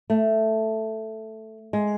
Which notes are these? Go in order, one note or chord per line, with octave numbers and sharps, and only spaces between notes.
A3
G#3